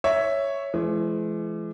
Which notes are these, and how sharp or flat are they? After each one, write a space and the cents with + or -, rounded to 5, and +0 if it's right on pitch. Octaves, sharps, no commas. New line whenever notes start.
C#5 +0 E5 +0
E3 +40 G#3 +40